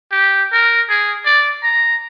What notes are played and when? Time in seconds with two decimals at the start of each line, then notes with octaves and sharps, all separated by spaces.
0.12 G4
0.52 A#4
0.89 G#4
1.25 D5
1.63 A#5